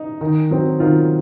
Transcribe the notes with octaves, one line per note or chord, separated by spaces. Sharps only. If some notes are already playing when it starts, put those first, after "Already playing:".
Already playing: D#4
D#3
F#3 C4
D#3 F4